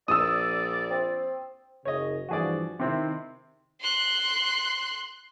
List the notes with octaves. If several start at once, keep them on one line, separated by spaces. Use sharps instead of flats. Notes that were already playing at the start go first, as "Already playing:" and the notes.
A#1 D5 D#6 E6
C4
F#1 C#3 C#5 D#5
G2 E3 F3 F#4 G#4 D5
C3 D#3 C4 E4
C6 F#6